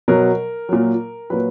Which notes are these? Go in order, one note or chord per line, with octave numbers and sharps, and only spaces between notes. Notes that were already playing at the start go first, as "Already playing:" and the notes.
B2 F#3 A#4
A#2 F#3
A#2 F#3 B4